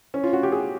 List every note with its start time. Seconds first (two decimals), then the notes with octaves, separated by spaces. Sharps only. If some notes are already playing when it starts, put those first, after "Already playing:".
0.14 C#4
0.23 F4
0.33 F#4
0.43 G4
0.52 G#4